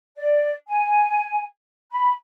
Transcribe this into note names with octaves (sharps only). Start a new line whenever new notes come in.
D5
G#5
B5